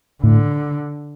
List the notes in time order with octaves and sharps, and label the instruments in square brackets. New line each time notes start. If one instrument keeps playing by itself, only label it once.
[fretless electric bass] A2 [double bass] D3